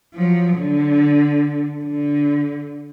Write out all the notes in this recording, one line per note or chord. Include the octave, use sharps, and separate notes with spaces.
F3 F#3
D3
D3